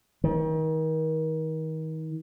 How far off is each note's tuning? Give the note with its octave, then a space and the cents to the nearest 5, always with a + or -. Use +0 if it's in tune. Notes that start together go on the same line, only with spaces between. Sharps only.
D#3 +35